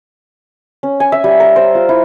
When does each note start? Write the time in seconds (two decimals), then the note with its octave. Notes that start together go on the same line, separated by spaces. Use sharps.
0.83 C#4
1.00 G#5
1.12 E5
1.24 G3
1.40 A#4
1.56 C5
1.75 F4
1.89 E4